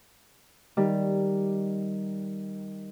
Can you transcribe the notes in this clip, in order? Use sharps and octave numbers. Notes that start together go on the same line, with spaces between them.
D#3 G3